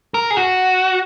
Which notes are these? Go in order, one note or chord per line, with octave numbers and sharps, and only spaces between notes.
A#4
G#4
F#4